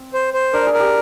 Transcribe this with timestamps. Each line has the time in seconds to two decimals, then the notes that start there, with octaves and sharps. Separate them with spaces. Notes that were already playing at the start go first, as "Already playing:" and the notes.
Already playing: C4
0.14 C5
0.34 C5
0.53 D4 A#4
0.67 G#4
0.73 A#4
0.80 G4